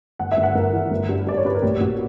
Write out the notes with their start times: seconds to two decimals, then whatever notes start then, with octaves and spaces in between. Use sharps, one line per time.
0.19 G1 F#5
0.32 E5
0.37 G1
0.43 F#5
0.55 G1 A#4
0.73 E3
0.91 G1
1.09 G2
1.27 G2 D5
1.37 C#5
1.45 G2 B4
1.54 A#4
1.62 A#1 G4
1.81 A#1 F#4